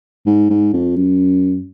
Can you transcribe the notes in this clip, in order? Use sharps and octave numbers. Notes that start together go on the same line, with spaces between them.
G#2
G#2
F2
F#2